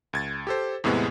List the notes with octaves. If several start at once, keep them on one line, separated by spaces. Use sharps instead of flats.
C#2 G#6 A6
G4 A4 C5
E2 A2 C3 G#3 B3